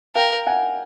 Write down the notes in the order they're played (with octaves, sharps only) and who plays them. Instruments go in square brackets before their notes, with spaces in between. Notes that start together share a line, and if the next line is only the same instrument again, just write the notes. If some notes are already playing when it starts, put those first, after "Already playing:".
[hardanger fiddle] A#4 [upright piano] F5 G5
[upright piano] F#5 G#5